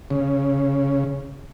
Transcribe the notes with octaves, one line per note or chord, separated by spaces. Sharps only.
C#3